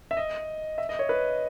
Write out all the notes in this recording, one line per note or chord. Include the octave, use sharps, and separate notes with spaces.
E5
D#5
E5
D#5
C#5
B4